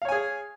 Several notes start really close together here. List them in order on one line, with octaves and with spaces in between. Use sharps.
F5 C#5 G#5 G#4